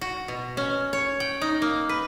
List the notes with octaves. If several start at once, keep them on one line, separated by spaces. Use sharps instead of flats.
F#4
B2
C#4
C#5
G5
D#4
A#3
B4